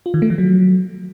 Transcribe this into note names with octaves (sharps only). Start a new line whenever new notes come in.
F4
D#3
A3
F3
F#3